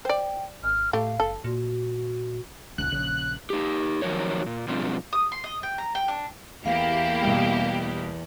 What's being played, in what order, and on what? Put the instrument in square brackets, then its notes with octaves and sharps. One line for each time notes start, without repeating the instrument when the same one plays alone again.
[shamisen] C5 D5 [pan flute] G5
[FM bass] G#1 [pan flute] F6
[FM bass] A2 [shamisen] A3 G4 [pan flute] F5
[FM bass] F#1 [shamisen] A4
[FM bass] A#2 [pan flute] F#4
[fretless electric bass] D#1 C#2 [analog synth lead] F#6
[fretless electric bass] A#1 C#3
[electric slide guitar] D#4 G4
D#3 F3 F#3 A#4 C#5
A#2
B2 F3 G3 C4 D4 F4
[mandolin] D#6
C6
D#5
G5
A#5
G5
D4
[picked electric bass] E2 [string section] A#3 E4 G4 [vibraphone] F5
[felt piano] B2 G3